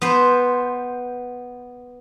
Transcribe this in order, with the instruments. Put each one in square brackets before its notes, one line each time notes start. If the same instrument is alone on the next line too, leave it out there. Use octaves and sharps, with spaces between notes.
[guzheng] B3 B4 C5